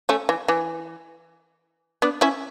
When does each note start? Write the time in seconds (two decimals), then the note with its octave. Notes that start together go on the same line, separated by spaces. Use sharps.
0.09 A3 C#4
0.29 E3
0.48 E3
2.02 B3 D4
2.21 C#4 E4